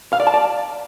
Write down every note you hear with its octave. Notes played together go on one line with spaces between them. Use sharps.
F5
D5
A5
D5